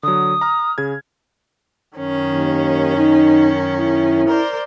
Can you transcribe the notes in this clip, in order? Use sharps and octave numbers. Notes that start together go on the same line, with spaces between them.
D3 F#3 D#6
A#5 F6
C#3 G#4 G#6
F#2 D#3 C#4
D#2
D#4
E4
A#4 C5 D5